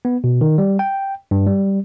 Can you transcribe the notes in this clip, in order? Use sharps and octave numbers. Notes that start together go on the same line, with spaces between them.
B3
B2
D#3
G3
G5
G2
G3